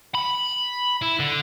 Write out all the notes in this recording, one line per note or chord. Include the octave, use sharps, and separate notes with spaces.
B5
E4
D3